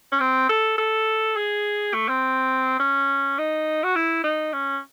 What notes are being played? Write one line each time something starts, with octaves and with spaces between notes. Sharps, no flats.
C#4
C4
A4
A4
G#4
A3
C4
C#4
D#4
F#4
E4
D#4
C#4